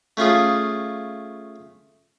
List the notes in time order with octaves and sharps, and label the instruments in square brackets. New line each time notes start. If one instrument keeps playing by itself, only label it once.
[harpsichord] A3 C#4 F4 G#4